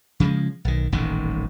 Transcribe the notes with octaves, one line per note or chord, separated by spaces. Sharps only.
C#3 F3 G3 G#3
B1 D#3
D#1 A1 A2 D#3